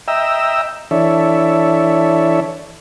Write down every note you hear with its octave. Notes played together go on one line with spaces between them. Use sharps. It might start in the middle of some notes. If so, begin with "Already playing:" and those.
D#5 E5 G5 A#5 E6
E3 D4 A4 C#5 E5